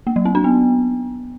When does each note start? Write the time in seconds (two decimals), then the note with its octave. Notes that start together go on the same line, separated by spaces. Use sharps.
0.07 A#3
0.16 F#3
0.25 C4
0.35 D4
0.44 B3